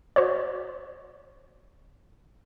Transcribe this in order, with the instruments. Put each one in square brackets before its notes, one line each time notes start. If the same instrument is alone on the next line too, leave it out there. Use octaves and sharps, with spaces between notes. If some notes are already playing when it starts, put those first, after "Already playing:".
[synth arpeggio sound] F#4 C5 C#5